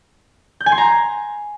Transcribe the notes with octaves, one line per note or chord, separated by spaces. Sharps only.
G6
G#5
C6
A#5